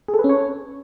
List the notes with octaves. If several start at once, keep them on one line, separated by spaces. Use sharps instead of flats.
G#4
A4
B4
C#4
C#5